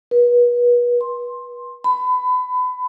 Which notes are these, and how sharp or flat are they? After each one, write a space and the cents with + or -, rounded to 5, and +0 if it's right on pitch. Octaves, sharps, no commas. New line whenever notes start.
B4 -35
C6 +10
B5 +25